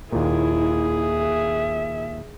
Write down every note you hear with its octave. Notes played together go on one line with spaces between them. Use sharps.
D#2 A#2 E4 G#4
E5